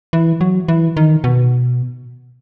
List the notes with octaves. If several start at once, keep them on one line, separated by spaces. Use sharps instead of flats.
E3
F#3
E3
D#3
B2